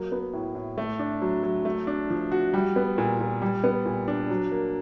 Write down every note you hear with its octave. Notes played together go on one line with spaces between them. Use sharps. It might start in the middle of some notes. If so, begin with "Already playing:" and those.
Already playing: F#3 A#3
B3
A2
A2
A3
D4
F#3
F#3
A3
D4
F3
F#4
G3
B3
A#2
A#2
G3
B3
A#2
D4
F#3
A#3